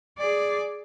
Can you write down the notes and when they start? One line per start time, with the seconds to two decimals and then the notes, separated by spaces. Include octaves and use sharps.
0.18 G#4 D5